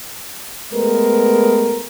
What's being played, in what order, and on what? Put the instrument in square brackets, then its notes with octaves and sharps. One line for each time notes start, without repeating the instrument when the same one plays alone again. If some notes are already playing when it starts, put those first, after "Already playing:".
[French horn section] G#3 A3 B3 A#4 B4